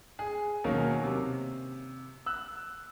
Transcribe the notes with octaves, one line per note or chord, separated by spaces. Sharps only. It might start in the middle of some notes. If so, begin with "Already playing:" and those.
G#4
B2 D#3 F#3 A#3 C#4 A#4
C3
E6 F#6